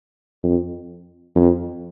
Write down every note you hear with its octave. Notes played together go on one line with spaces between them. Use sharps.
F2
F2